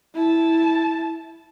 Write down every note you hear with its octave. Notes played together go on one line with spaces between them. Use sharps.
E4 A5